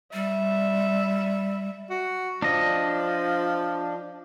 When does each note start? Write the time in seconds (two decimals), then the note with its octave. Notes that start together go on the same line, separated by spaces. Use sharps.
0.13 G3 E5
1.90 F#4
2.42 F3 D4 D#5